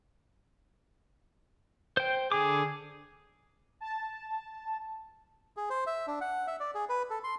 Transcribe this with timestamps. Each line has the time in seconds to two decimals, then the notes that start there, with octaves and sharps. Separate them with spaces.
1.97 C5 G5
2.32 D3 G#4 D6
3.80 A5
5.57 G#4
5.70 C5
5.87 E5
6.07 D4
6.21 F#5
6.47 E5
6.60 D5
6.74 G#4
6.89 B4
7.10 A4
7.24 C6